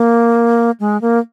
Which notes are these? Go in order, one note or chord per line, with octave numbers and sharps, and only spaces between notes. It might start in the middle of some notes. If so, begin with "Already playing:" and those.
Already playing: A#3
G#3
A#3